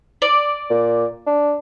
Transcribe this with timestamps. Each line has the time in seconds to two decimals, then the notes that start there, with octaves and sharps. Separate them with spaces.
0.22 D5
0.70 A#2
1.27 D4